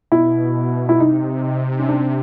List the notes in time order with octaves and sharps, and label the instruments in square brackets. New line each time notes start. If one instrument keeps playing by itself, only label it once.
[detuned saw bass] B2 [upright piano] E4
[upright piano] E4
[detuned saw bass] C3 [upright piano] D#4
[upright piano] C#4
D4